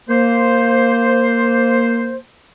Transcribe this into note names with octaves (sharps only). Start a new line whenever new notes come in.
A#3 C5